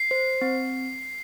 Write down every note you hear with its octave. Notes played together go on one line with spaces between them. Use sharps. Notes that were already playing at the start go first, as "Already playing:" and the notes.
Already playing: C7
C5
C4